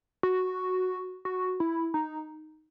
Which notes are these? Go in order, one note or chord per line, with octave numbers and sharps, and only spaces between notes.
F#4
F#4
E4
D#4